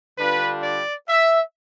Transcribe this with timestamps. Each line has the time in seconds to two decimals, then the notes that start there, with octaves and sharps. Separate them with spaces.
0.17 D3 G3 D4 F4 B4
0.63 D5
1.08 E5